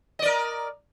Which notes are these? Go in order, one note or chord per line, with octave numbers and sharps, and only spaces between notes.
A#4 D5 D#5